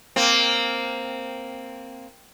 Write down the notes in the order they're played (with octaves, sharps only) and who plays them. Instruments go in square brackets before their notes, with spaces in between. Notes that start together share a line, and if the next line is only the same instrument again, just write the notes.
[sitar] A#3 C4